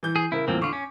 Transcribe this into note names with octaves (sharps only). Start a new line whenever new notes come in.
E3 G6
G#4
C#3 E4 A#4
E2 A2 F3 A#3 C4
D3 F4 C#6 D6
C#4